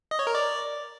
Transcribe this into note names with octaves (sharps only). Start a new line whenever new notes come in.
D#5
C#5
A#4
D5